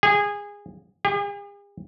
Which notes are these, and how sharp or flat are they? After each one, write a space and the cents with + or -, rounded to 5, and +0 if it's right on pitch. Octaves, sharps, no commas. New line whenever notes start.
G#4 -20
G#4 -45